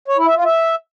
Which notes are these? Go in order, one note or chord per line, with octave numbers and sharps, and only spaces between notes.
C#5
E4
E5
F4
E5